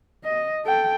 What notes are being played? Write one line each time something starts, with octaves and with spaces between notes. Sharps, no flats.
D#5
A4 G5